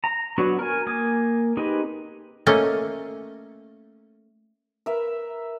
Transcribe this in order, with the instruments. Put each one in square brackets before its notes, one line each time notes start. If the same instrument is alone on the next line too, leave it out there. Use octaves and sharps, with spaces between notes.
[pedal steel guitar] A#5
F#3 B3 D4 F#4
A#4 G#5
A#3 G#5 D6 D#6
C4 D#4 G4 G#4 B4
[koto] A3 A#3 C#4 D#5 G#5
[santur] A#4 B4 E5